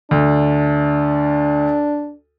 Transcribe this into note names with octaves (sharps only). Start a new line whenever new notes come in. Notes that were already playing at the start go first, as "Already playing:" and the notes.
D2 D4